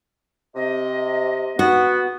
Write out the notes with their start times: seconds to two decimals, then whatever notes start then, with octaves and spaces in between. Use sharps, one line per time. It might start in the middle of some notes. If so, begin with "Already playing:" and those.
0.55 C3 D#5
1.59 B3 F#4